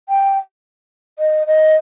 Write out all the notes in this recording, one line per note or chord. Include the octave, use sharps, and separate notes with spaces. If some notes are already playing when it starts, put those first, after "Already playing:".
G5
D#5
D#5